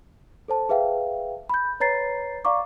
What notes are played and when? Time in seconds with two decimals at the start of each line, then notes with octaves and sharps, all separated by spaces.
0.48 A4 C5 A5
0.69 G#4 B4 E5 F5 G5
1.49 B5 G6
1.80 B4 C#5 A#5 A6 C7
2.45 D5 F5 A#5 C#6 D6